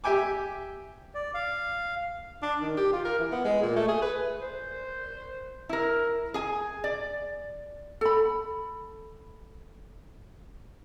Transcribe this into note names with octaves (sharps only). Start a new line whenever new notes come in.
G4 E5 G5 G#5 D6
D5
F5
D4
D#3
G4
F4
A#4
E3
B3
G#3
A#2
A3
G#4
B4
C5
E4 A#4
G#4 G#5
D5
A4 B5